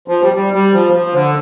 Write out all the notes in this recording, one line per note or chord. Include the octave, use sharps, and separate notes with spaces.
F3
G3
G3
G3
F3
F3
D3